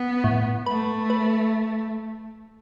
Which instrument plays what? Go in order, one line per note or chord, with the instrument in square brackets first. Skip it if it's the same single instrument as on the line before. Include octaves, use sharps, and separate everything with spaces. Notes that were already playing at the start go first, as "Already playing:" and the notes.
Already playing: [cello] B3
[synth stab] A2
[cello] A3 [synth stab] B4
[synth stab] B4